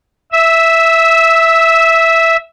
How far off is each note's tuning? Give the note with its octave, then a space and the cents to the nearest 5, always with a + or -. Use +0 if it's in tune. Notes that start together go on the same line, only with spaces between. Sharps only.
E5 +0 E6 -20